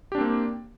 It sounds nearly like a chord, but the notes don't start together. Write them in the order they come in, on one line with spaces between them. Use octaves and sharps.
G4 D4 C4 A#3